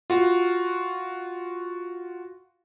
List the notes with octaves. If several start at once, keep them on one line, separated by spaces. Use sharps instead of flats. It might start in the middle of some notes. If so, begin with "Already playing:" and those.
F4 F#4